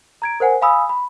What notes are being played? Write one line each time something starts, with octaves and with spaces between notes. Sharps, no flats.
A#5 G#6 D7
A#4 C5 F#5 G#5
F5 G#5 B5 D#6 E6
B5